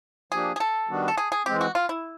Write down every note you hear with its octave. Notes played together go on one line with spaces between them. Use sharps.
F3 A#3 D4 G4 G#4
G#4
A4
D#3 G3 B3 D4 F#4
A4
G#4
G#4
E3 G#3 C4 G4
F#4
F4
E4